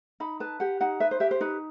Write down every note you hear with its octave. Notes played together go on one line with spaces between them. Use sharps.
D#4 B5
B4 A5
G4 F#5
D#4 F#5
B4 E5
C5
G4 E5
C5
D#4 B4